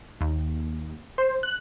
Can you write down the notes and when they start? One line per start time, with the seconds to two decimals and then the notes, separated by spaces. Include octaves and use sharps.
0.21 D#2
1.18 C5
1.43 F#6